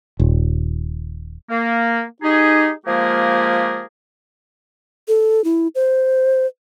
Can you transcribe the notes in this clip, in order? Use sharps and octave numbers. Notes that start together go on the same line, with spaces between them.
D#1
A#3
D#4 G4 G#4
F3 G#3 A#3 G4 G#4 A#4
A4
E4
C5